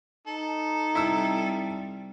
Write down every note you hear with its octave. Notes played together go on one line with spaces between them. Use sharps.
D#4 A4
C3 G3 E4 E6